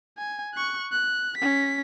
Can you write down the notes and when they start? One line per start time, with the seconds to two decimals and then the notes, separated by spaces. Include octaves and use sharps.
0.18 G#5
0.54 C#6 F#6
0.92 F#6
1.38 C#4 B6